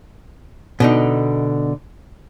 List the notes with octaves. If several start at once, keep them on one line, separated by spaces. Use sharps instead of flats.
B2 D3 D#4